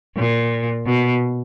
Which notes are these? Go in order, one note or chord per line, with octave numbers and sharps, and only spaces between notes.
A#2
B2